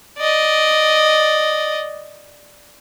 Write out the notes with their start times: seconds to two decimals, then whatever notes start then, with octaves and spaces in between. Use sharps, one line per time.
0.19 D5 D#5